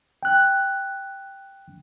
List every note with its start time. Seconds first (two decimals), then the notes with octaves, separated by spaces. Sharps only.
0.23 G5 F#6